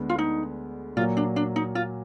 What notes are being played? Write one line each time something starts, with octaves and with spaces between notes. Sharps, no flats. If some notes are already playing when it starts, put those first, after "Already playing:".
Already playing: D2 D3 G#3 B3
F4
D#4
A#2 F#3 A#3 F4
D4
D4
D#4
F4